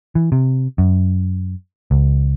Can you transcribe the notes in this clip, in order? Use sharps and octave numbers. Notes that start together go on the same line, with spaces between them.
E3
C3
F#2
C#2